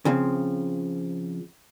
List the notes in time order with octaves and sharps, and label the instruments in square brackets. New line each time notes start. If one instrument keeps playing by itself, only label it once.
[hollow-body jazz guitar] C#3 F3 C4